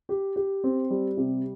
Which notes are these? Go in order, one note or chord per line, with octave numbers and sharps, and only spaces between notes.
G4
G4
C4
G3
C3